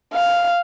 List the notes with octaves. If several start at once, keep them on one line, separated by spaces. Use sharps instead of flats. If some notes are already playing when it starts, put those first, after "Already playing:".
F5